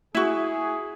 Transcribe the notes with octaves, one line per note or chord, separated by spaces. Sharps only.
E4 F#4 G#4